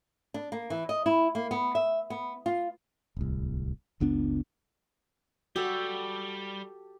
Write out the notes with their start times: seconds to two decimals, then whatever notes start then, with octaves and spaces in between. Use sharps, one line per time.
0.34 D4
0.52 A#3
0.70 E3
0.89 D#5
1.06 E4
1.35 A#3
1.51 B3
1.75 E5
2.10 B3
2.46 F4
3.17 D1 C2
4.00 F#1 C#2 B3 D4
5.56 G3 F#4 G4 A4